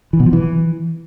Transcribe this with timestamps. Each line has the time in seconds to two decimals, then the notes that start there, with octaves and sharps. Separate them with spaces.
0.13 E3
0.20 B2
0.26 F3
0.33 E3